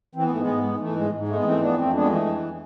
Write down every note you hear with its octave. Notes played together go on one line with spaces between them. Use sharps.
E3 C4
B3
G#2 A3
G#3 B3
G#2
G#3
G#3
E3 A3
G#2 G#3
G#2
G#3 A3
B3
E3 A3 C4
F2 B3 D4
F2 A3 C4
G#3 B3 D4
E3 A3
F2